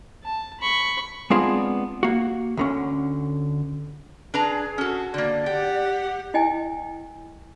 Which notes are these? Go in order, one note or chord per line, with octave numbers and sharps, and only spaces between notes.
A5
B5 C#6
G#3 B3 C4 D4 F4 G#4
A#3 F#4
D2 D3 C#4
D4 G#4 B4 A#5
C#4 F#4 A4
D3 A#3 D5
G4 F#5 G5
E4 D#5 G5 G#5